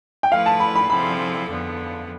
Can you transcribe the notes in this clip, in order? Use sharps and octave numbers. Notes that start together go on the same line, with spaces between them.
G5
F3 A3 E4 B4 F5
A5
B5
B5
C3 F3 C4 E4 A4 B5
F2 D3 F3 B3